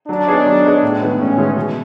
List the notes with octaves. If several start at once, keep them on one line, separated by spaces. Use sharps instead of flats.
F#3 D4
B3 D#4 G#4 C#5
F#3
B3 D#4 G#4 C#5
A2
E3 G#3 B3
A2 C#4
E3 G#3 B3
B2